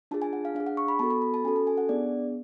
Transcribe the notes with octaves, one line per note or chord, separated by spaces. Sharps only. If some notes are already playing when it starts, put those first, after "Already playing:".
D4 F4 G#4 A5
G#5
F#5
F5
D4 F5
G#4
F#5
C#6
B5
B3 F#4 A4 A5
B5
B5
A5
C#4 F#4 A4 G#5
A5
G#5
F#5
B3 D4 G#4 D5